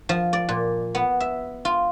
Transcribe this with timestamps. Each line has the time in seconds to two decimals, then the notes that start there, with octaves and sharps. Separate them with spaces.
0.09 F3
0.33 D5
0.49 A#2
0.95 B3
1.20 E5
1.65 F4